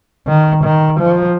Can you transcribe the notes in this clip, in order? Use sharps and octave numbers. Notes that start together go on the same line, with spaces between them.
D#3
D#3
F3